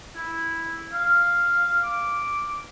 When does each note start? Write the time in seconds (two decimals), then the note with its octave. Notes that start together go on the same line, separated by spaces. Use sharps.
0.16 E4
0.93 F5
1.84 D6